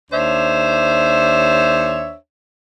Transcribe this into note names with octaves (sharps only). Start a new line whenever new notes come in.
D#2 D4 C5 C#5 E5